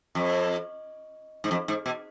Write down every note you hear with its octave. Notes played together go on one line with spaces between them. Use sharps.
F2
G#2
F2
G#2
B2